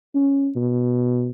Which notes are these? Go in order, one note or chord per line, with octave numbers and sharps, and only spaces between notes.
C#4
B2